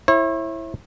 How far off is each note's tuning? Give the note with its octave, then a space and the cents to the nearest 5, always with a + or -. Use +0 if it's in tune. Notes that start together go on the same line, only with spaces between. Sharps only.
E4 +0 C#5 -40